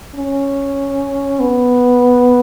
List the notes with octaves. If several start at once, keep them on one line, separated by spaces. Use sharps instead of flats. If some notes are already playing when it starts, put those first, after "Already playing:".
C#4
B3